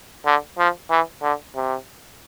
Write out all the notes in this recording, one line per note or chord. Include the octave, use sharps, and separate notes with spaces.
D3
F3
E3
D3
C3